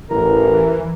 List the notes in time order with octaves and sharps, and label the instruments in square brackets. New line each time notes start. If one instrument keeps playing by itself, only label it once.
[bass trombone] A1 [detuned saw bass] E3 [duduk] A#4